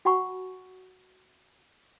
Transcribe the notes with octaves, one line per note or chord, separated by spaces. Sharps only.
F#4 F#5 G#5 B5 C#6